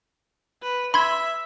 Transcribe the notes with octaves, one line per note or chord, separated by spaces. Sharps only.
B4
E5 B5 C6 G#6